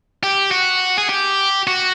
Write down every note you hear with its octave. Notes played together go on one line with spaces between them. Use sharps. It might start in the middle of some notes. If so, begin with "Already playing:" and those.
G4
F#4
G#4
G4
F#4